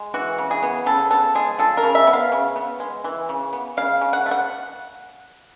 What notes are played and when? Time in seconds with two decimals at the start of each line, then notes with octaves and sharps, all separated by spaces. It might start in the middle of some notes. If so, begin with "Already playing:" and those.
Already playing: G#3
0.14 E3 F#4
0.38 C#3
0.51 G#4
0.63 B3
0.86 C#3 A4
1.10 B3 A4
1.35 G#3 G#4
1.59 F3 A4
1.77 A#4
1.83 C#3
1.95 E5
2.07 B3
2.13 F5
2.32 C#3
2.56 B3
2.80 G#3
3.04 E3
3.29 C#3
3.53 B3
3.77 C#3 F5
4.01 C#3
4.13 F#5
4.26 A3
4.31 F#5